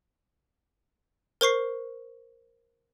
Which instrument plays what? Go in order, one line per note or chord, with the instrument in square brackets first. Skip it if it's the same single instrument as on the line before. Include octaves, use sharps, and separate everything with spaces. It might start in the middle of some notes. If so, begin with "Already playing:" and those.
[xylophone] A#4 C5 C#6 C7